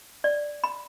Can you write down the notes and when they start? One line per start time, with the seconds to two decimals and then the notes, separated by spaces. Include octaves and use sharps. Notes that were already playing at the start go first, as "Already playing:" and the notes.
0.24 D5
0.64 B5